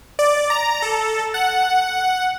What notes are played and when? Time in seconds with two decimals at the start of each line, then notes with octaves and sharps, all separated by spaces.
0.19 D5
0.50 A#5
0.82 A4
1.34 F#5